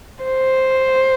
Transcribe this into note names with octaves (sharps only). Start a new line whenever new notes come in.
C5